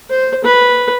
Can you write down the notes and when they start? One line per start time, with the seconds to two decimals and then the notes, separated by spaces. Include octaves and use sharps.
0.10 C5
0.44 B4